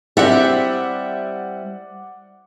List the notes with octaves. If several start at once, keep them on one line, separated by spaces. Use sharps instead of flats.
G3 C4 E4 G4 D5 E5 F#5